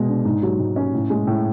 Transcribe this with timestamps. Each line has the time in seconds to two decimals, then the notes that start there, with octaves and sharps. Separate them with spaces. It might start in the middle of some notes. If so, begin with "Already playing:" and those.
Already playing: B2 G#3
0.09 D4
0.25 G#2
0.43 F#3
0.59 G#2
0.76 C#4
0.94 A2
1.10 G#3
1.27 A2